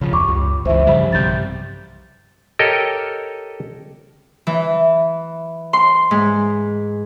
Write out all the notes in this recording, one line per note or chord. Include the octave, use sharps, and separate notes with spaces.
C#3 F3
E2 G2 C#6 D6
C#2
C#2 E3 C5 E5
G2 C#3 E3 F3 G3
B1 C3 G3 G6 A6
G4 A4 A#4 C#5 D#5
E3
C6
G#2